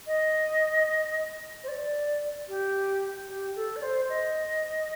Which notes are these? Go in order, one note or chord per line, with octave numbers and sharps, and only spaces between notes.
D#5
C5
D5
G4
G4
A4
D5
C5
D#5